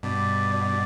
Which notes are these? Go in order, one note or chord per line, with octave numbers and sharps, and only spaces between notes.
G2 B2 D5
D5